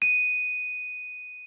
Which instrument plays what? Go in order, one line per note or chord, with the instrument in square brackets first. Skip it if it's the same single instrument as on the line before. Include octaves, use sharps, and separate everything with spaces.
[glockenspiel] D#7